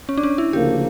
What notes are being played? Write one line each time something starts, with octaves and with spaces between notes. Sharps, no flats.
C#4
D4
C#4
E4
D2 C#3 F3 A#3 G4